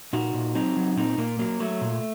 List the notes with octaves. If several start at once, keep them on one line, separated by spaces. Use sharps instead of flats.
A#2 D#4 F#4
A#2
F#3 C4 D#4
F#3
A#2 C4 D#4
A#2 A#3
F#3 A#3
F#3 A3
A#2